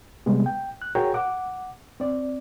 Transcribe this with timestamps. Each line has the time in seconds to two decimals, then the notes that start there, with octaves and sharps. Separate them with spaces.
0.26 C3 G3 G#3 B3
0.46 G5
0.82 F#6
0.95 F#4 G#4 A#4 C#5 G5 A#5
1.14 F#5 D6
2.00 C4 D5